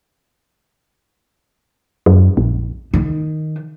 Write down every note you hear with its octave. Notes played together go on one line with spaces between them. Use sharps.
F#2
A#1
D#3